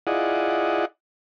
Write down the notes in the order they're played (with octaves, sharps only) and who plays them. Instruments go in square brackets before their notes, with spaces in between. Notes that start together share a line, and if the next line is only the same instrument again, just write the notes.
[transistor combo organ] E4 F4 G#4 D5 D#5 F#5